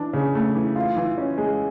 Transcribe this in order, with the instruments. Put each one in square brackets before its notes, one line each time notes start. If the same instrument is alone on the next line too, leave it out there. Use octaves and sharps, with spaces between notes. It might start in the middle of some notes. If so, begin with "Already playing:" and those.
Already playing: [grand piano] E3 D4
C#3
A3
E3
F4
E3
C#4
G#3